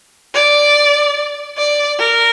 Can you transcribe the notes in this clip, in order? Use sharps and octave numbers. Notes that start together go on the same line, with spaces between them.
D5
D5
A#4